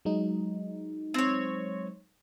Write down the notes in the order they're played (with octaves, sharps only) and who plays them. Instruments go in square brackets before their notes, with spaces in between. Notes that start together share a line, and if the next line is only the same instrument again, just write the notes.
[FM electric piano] F#3 G#3 D#4
[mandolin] C4 C#5